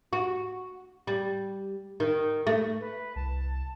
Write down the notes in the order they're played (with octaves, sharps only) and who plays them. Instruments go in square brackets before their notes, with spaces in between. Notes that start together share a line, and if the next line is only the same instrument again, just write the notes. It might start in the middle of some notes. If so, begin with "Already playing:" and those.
[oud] F#4
G3
D#3
A3
[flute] B4
[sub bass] C2 [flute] A5